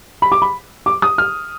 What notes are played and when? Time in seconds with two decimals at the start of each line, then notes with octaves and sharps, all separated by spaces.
0.22 B5
0.32 D6
0.42 B5
0.86 D6
1.02 D#6
1.18 F6